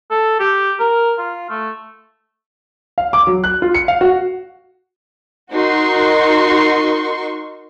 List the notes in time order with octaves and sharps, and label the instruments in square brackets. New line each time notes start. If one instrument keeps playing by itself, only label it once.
[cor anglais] A4
G4
A#4
F4
A3
[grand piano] F5
D6
F#3
F#6
F4
C#7
F5
F#4
[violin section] D#4 F#4 A#4 C6 C#6